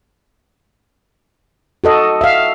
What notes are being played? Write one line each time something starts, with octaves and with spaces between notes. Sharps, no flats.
F#4 A4 D#5
E5 F5